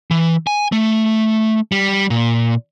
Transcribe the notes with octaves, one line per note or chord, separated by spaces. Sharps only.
E3
G#5
A3
G3
A#2